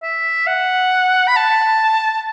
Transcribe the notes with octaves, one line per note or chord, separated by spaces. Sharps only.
E5
F#5
B5
A5